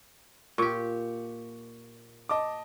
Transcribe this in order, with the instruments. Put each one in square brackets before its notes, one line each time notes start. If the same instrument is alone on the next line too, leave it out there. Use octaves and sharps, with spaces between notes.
[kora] A#2 G4 [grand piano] C#6
[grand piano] D#5 A5 D6